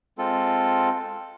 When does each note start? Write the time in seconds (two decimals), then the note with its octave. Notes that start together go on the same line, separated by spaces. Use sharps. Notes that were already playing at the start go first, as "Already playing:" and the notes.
0.18 G#3 C4 F4 A4